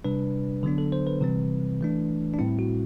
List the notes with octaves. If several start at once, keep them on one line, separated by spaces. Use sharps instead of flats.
C3 G3 D4 B4
D3 F#3 B3 D4
A4
C5
B4
C3 E3 G3 C4
E3 A3 D4
D4
A2 G3 C4 E4
F#4